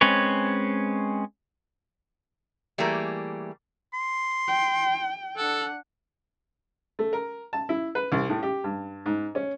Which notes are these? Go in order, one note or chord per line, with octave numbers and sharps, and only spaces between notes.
G#3 C4 C#4 B4 C#5
E3 G3 A3 A#3 G#4
C6
G5
D4 A4 F#5
A3
A#4
A5
E4
B4
C2
A2
G4
G2
G#2
C#4